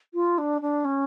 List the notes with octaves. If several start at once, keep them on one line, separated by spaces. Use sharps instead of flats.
F4
D4
D4
C#4